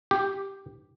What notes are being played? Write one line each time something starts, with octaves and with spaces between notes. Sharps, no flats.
G4